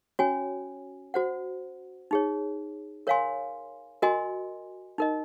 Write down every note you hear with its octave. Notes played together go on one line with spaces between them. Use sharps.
C#4 F#4 C#5 G#5
F#4 C5 F#5
D#4 G#4 C#5
A#4 C#5 F5 G#5 C6
F#4 A#4 D#5 G#5 C6
D#4 A#4 D#5